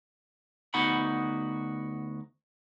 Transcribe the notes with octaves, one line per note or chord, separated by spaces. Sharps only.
D2 B3 D#4 F#4 F#5 B5